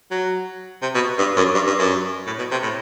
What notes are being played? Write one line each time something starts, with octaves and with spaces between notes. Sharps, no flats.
F#3
C3
B2
G2
F#2
G2
G2
F#2
A2
B2
C3
A2